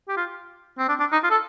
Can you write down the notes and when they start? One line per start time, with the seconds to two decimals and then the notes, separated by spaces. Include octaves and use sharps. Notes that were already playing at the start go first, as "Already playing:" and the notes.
0.09 G4
0.17 F4
0.78 C4
0.89 D4
1.00 D4
1.12 D#4
1.24 F4
1.31 A4